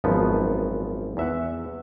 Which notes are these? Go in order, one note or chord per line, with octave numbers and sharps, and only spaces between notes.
G#1 F#2 F3 B3
E2 E5 F#5